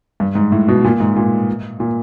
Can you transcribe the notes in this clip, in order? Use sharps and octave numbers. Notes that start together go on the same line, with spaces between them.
G2
G#2
A2
B2
A#2
G#2
A#2
A#2